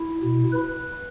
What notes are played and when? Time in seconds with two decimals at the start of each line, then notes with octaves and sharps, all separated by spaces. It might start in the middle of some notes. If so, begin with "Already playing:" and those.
Already playing: E4
0.23 B2
0.52 B4